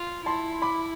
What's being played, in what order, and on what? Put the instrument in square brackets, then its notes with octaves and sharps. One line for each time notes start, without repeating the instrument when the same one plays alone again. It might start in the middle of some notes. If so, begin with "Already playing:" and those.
Already playing: [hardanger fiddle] F4
[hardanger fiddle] E4 [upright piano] A5 C6
[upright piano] B5 D6